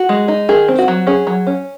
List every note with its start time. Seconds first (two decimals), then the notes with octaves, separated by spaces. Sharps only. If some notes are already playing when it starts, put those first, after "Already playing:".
Already playing: F#4
0.09 G#3
0.28 D#4
0.49 D#3 G#4
0.68 C4
0.78 F#4
0.88 F#3
1.07 C#4 G#4
1.27 F#3
1.47 C#4